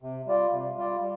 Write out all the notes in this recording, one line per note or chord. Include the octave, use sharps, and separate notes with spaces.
C3
G3 F4 D5
C3
G3 F4 D5
G3